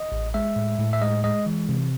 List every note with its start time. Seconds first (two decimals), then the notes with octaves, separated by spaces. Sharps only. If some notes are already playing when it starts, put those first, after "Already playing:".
Already playing: D#5
0.12 A1
0.34 G#3 E5
0.56 A2
0.79 A2
0.93 E5
1.02 G#3 D#5
1.24 G#3 D#5
1.46 E3
1.69 C3